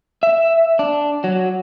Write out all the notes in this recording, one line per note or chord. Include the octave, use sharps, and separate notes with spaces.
E5
D4
F#3